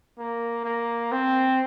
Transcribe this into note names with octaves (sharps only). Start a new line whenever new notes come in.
A#3
A#3
C4